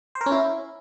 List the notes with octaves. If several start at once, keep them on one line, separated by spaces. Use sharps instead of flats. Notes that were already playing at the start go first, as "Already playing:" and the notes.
C5
A#4
C#4
E4